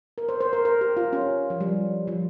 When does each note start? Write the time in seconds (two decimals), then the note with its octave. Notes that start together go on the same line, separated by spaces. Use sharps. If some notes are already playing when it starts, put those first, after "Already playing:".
0.18 A#4
0.29 C5
0.41 C5
0.53 A#4
0.65 A#4
0.81 G4
0.97 F4
1.13 C#4
1.50 F3
1.61 G3
2.08 F3